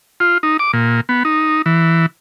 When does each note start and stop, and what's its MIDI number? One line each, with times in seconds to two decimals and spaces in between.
0.20 0.38 65
0.43 0.57 63
0.59 0.71 86
0.73 1.01 46
1.09 1.23 59
1.25 1.62 63
1.66 2.06 52